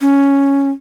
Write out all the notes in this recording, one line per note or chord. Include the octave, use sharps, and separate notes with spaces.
C#4